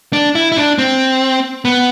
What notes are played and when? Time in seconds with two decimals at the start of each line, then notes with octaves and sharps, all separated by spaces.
0.13 D4
0.35 E4
0.52 E4
0.57 D4
0.78 C4
1.65 B3